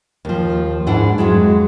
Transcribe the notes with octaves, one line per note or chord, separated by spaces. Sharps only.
D#2 F3
G#2 D4 E4 F#5
F2 F#3 G#3 E4